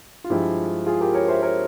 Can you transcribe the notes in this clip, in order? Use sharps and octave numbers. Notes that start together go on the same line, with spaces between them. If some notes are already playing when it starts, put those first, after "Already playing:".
F4
G2 F3 G#3 E4 G4
F4 G#4
G4 A#4
A#4 C#5
C5 E5
A#4 C#5